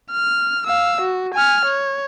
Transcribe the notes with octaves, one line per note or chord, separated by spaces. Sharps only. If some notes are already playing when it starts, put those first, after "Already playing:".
F6
F5 E6
F#4
G#5 F6
C#5